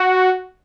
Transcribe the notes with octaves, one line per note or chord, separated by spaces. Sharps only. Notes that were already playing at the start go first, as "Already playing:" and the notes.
Already playing: F#4